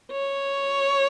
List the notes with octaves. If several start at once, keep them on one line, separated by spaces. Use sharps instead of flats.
C#5